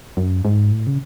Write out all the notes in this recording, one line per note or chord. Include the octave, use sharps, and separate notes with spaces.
F#2
G#2
A2
C#3